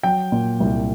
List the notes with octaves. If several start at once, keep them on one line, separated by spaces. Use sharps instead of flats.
F#3 G5
A#2
C2